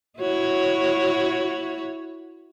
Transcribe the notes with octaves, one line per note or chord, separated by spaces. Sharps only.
E4 F#4 C#5